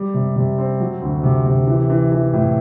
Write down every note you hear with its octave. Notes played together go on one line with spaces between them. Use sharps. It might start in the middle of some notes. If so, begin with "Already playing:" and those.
Already playing: G3
C3
C3
C4
F#3
D2
C3
C3
E3
E3
E3
A2